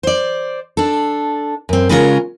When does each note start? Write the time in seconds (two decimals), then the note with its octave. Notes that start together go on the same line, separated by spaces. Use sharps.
0.03 C5 D5
0.77 D4 A4
1.69 F#2 C4
1.89 C#3 G#3 C#4 F4 F#4 A#4